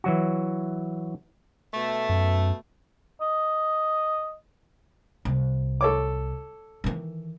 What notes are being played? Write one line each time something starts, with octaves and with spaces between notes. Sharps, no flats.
E3 F#3 F#4
B2 A3
F#2
D#5
C2
A4 C#5 D6
D#3 E3